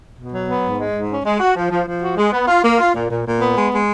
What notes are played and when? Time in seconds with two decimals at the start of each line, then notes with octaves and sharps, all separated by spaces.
0.17 B2
0.32 F#3
0.47 B3
0.63 G#2
0.78 G#3
0.94 G#2
1.09 C#4
1.24 G#3
1.40 F#4
1.55 F3
1.70 F3
1.86 F3
2.02 F#4
2.17 G#3
2.32 B3
2.48 F4
2.63 A#3
2.78 F4
2.94 A#2
3.09 A#2
3.25 A#2
3.40 B3
3.55 G#3
3.71 G#3